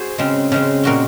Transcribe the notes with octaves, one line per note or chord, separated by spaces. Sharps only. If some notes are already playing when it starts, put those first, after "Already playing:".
Already playing: F#4 G#4 C5
C#3 G#3 C4
C#3 G#3 C4
A#2 G#3 C4 F#4 A#4